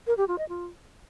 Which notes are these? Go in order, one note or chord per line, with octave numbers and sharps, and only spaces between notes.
A#4
G4
F4
D#5
F4